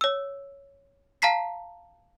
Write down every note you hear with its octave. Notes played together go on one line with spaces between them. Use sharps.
C#5 E6
F5 A5 A#5 B6 C7